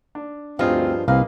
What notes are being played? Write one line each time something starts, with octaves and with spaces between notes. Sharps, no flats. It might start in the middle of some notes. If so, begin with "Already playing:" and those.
D4
D2 G2 F3 C4 D#4 F4 G#4
C2 A#3 C4 B4 D#5 F5